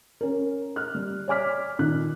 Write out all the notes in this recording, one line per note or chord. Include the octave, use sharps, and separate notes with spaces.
C#4 A#4
F6 F#6
G3
C#5 D5 G#5 D6 F6 B6
A#2 D#3 F#6